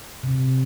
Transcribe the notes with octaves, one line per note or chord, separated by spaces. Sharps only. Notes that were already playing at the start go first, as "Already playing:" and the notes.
C3